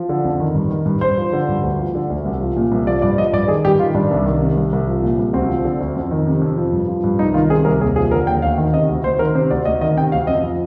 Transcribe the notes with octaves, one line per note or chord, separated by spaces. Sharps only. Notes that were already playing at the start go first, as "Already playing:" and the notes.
Already playing: F3
D3
F2
D#3
G2
D#3
G2
G2 C5
F3
D3
G2
D2
F3
D3
D2
C2
F3
A#2
C2
F3 D5
G2 D5
F3 D#5
G2 D5
D#3 G#4
G2 G4
D#3 F4
G2 D4
C2
D#3
C3
C2
C2
F3
A#2
C2
D2 C4
F3
D3
D2
F2
D#3
C3
F2
F3
G2
F3
G2
C2 D#4
D#3 F4
C3 G#4
C2 A#4
D#2 G#4
F3 G#4
D3 A#4
D#2 G5
D2 F5
D#3
C3 D#5
D2
D2 C5
D#3 A#4
C3 C5
D2 D5
D2 D#5
D#3 D#5
C3 G5
D2 F5
F2 D#5
F3